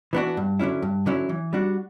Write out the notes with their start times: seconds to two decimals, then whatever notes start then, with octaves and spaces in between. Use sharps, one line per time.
0.13 E3 B3 D4 F#4
0.37 G2
0.59 D3 F#3 C#4 E4
0.82 G2
1.06 D3 F#3 C#4 E4
1.29 E3
1.53 G3 D4 F#4